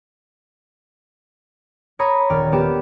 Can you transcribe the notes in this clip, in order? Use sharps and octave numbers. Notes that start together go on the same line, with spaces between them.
C#5 A#5 B5 D#6
D#1 D5 F6
B3 G4 E7